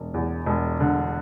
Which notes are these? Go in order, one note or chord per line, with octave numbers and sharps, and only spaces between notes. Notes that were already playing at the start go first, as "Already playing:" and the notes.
Already playing: E1
E2
E1
D3